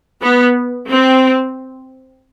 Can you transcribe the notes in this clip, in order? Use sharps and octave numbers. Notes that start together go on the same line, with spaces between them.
B3
C4